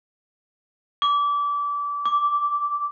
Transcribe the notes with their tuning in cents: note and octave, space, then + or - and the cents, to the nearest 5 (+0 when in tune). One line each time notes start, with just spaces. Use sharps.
D6 -25
D6 -10